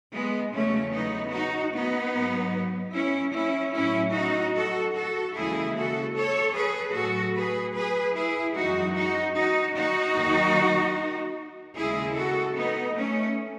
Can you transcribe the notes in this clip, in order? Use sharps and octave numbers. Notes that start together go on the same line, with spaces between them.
G#3 B3
E2 C#3 F#3 A3 C#4
B3 D#4
D#4 F#4
B3 D#4
G#2 F#3
C#4 E4
C#4 E4
A2 F#3 C#4 E4
D#4 F#4
F#4 A4
F#4 A4
D#2 C#3 E3 G#3 E4 G#4
F#4 A4
A4 C#5
G#4 B4
A2 F#3 F#4 A4
G#4 B4
G#4 B4
E4 G#4
F#2 E3 G#3 D#4 F#4
D#4 F#4
D#4 F#4
D#4 F#4
D#2 D#3 F#3
D#2 C#3 G#3 E4 G#4
F#4 A4
B3 D#4
A3 C#4